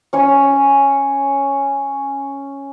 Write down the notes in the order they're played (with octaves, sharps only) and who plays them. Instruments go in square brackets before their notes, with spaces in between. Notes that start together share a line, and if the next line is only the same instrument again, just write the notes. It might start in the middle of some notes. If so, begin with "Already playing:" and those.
[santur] C#4 C#5 C#6